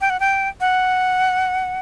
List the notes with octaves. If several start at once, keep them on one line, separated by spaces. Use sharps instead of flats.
G5
F#5
G5
F#5